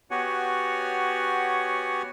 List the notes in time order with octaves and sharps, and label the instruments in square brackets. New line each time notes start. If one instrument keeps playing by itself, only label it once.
[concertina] B3 F#4 G4 C#5 F#5 G#5